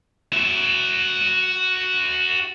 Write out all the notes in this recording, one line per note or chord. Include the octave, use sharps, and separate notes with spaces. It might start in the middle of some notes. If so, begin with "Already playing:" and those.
F#4 E5